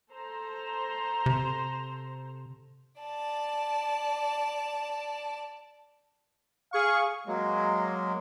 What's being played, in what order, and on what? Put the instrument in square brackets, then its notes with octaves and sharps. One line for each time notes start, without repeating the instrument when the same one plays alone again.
[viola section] A4 C5 A#5
[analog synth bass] C3
[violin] D5 A5
[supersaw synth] G#4 C#6 [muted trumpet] F5
[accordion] F#3 G#3 A#3